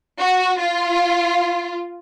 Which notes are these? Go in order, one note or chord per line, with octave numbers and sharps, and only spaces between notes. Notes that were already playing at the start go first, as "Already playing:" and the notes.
F#4
F4